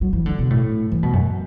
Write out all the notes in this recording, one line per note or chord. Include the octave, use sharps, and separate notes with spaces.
F#3
E3
D3
B2
A2
E3
B2
F#2